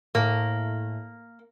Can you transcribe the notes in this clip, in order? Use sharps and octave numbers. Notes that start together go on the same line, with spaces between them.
A2 A#3